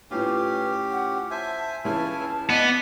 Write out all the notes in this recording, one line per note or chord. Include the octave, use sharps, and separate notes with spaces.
A2 C#4 F4 G4 B4
F#5
C5 E5 G#5 A5
C#2 C#3 E3 C#4 E4 G#5 A5
B3 D5 D#5